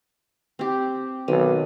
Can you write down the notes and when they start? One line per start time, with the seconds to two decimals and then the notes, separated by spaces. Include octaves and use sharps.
0.59 C4 G4
1.28 B1 D#3